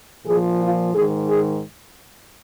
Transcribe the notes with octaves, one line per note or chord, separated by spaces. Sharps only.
A#2 F3 G#4
F4
G#2 D#3 G#4
G#4